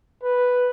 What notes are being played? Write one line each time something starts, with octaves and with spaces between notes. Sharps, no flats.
B4